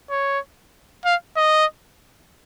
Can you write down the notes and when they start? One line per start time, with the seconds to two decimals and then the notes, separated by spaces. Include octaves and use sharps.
0.10 C#5
1.05 F5
1.37 D#5